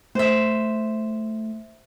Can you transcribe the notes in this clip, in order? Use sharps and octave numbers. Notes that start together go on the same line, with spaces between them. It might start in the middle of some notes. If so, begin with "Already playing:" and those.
A3 C5 E5